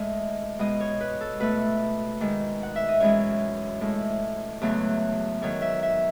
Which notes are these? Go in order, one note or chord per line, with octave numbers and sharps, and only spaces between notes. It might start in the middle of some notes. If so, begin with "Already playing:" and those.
Already playing: A2 G#3 D#5
B2 G#3 D#5
C#5
B4
A4
B2 A3 B4
G#2 D#3 G#3
F#5
E5
D#5
F#2 E3 G#3 C#5
A2 G#3
E2 C#3 F#3 A3
G#2 D#3 F#3 C#5
E5
E5